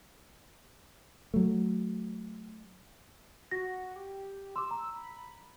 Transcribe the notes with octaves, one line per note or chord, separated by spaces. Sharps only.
F#3 A3
F#4 A#6
G4
C6 D6 E6
A#5
B5